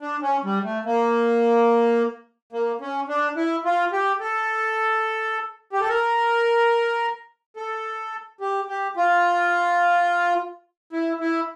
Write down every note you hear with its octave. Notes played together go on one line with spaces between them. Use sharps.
D4
C#4
G3
A3
A#3
A#3
C#4
D4
E4
F4
G4
A4
G4
A4
A#4
A4
G4
G4
F4
E4
E4